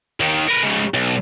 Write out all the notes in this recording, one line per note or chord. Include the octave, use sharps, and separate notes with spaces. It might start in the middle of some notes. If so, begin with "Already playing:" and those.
D#2 D#3
A#4 B4
G#2 C#3
B1